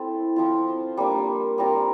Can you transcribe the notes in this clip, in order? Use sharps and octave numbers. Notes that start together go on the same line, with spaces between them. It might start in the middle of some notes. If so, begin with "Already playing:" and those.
Already playing: C4 E4 A4
F3 C4 F4
G3 A#3 D4
G3 C4 F4 A#4